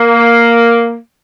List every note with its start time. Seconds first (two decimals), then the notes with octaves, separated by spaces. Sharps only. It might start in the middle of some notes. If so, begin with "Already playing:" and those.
Already playing: A#3